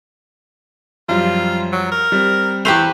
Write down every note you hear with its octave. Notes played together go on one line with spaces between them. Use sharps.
F#2 F3 G3 F4
F#3
A#4
G3 C4
E2 A3 G4 B4 C5 F7